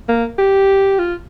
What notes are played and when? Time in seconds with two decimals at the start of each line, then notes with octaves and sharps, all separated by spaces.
0.08 A#3
0.38 G4
0.99 F4